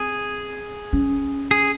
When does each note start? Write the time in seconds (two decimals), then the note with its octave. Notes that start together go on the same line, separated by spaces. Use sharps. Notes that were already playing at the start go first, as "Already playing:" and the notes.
Already playing: C4 G#4
0.93 C#4
1.51 G#4